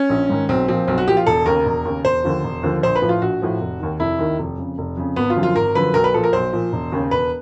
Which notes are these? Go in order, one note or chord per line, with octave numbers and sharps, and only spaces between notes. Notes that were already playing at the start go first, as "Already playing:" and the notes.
Already playing: C#4
A#1
G#2 D#3
B1 C4
A#2 F3 C4
B1 C4
F#4
A#2 F3 G4
F4
E1 A4
D#2 C#3 A#4
E1
D#2 C#3
E1 C5
D#2 D3 F3
E1
D#2 D3 F3
A#1 C5
B4
A2 F3
F4
A#1 F#4
A2 F3
F1
D#2 D#3
F1 E4
D#2 D#3
F1
F2 C#3
F1
F2 C#3
G#1 B3
F4
F#2 D3 F3
F4
G#1 A#4
F#2 D3 F3 B4
B1 A#4
B4
A#2 F3 A4
A#4
B1 C5
A#2 F3
E1
D#2 C#3
E1 B4